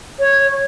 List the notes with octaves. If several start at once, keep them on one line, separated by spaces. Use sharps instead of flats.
C#5